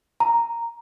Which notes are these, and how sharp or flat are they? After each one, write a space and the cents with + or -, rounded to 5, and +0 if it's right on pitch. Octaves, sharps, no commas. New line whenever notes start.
A#5 -5